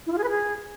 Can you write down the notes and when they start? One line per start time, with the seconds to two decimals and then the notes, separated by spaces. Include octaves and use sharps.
0.07 E4
0.12 F4
0.18 G#4
0.24 B4
0.30 G#4